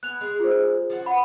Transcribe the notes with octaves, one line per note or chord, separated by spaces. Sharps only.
B3 G#5 F#6 F7
G#3 G#4
F4 C5
F3 C#4 F#4
F#5 B5